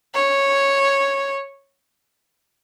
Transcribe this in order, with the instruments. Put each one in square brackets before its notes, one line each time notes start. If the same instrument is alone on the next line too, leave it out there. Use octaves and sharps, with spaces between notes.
[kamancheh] C#5